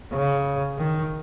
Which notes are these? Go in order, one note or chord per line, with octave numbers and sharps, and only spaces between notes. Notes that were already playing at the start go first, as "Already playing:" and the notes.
C#3
D#3